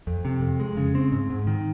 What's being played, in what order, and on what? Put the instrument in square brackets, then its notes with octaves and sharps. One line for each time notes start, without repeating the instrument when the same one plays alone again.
[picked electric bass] F2
C3
F2
G#3
C#3
C4
G#2
G#2
D#3